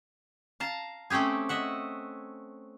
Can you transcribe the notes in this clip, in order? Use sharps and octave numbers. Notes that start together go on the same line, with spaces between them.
F5 A5 A#5
A3 C4 C#4 G4 G#4
D#5 E5 F#5